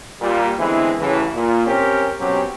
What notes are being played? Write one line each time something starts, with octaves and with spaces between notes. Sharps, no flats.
A#2 G3
D3 E3 G#3 B3 C4 E4
A1 C#3 E3
A#2
C4 C#4 G4 A#4
B2 F#3 C4 C#4 G4